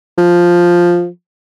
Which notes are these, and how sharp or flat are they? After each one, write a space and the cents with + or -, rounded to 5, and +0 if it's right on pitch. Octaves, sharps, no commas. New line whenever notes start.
F3 +0